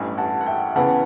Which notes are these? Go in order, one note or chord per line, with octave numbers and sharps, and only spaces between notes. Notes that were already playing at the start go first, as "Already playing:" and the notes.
Already playing: A1 G2 E3
F#5 A5
F#5
E5 G5
C#3 E3 B3 F#5 A5